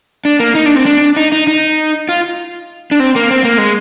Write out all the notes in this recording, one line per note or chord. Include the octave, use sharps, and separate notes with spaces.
D4
A#3
D#4
D4
C4
D4
D#4
D#4
D#4
F4
D4
C4
A#3
C4
A#3
G#3